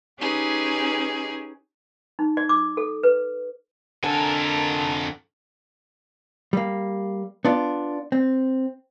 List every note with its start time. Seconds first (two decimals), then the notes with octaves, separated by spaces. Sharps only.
0.19 C#4 D#4 G4 G#4 B4
2.19 D#4
2.37 D5
2.49 D6
2.77 A4
3.03 B4
4.04 F2 D3 A4 A#4 G#5 A5
6.53 G3 A#3
7.45 B3 D4 F4
8.12 C4